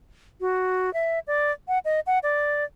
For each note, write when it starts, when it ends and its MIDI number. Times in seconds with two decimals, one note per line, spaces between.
0.41 0.93 66
0.94 1.19 76
1.27 1.52 74
1.68 1.79 78
1.85 2.00 75
2.07 2.19 78
2.23 2.65 74